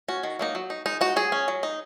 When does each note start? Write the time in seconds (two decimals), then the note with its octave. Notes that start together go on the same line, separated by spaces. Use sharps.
0.08 C#4 F#4
0.23 D#3
0.39 F#3 A#3 D#4
0.55 F#3
0.70 D#4
0.86 G#3 D#4
1.01 D#4 F#4
1.16 F#3 G#4
1.32 C#4
1.48 F#3
1.63 D#4